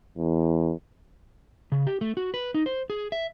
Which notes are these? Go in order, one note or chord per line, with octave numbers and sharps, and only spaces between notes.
E2
C#3
G4
A3
F#4
B4
D#4
C5
G#4
E5